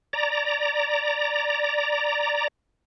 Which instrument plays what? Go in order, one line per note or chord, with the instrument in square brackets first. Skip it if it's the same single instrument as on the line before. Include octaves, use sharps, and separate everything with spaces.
[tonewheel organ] D5 A#5